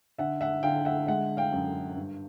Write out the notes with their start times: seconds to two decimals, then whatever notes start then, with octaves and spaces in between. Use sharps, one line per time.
0.18 D3 E5 F#5
0.41 E5 F#5
0.63 D3 F5 G5
0.85 E5 F#5
1.07 G#3 E5 F#5
1.37 F5 G5
1.53 F#2
1.96 G2